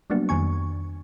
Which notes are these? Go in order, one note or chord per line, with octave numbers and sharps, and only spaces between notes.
F#3 G3 A#3 B3 D4 F#4
F2 D#3 G#5 C#6